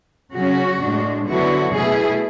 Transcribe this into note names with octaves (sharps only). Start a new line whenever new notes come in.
C#3 F#3 C#4 F#4
A2 G#3 D4
D3 F#3 B3 E4 F#4
B2 A3 E4 G#4